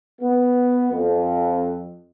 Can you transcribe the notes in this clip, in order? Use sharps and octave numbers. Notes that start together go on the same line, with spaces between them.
B3
F2